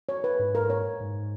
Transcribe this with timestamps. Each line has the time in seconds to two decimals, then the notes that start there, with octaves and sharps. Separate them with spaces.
0.09 C#5
0.24 B4
0.39 G#2
0.55 A#4
0.70 C#5
1.00 G#2